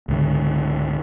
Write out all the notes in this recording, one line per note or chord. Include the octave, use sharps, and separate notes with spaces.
C#2 G#2 D3